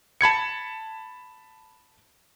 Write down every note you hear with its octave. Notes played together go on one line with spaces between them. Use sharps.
A5 B5 G#6 C#7